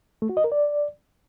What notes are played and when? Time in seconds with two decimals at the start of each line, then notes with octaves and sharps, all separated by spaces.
0.22 A3
0.29 F#4
0.37 D#5
0.44 A#4
0.52 D5